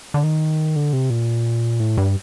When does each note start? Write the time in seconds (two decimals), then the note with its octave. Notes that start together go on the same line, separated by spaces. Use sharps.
0.14 D3
0.23 D#3
0.76 D3
0.93 C3
1.10 A#2
1.80 A2
1.98 G2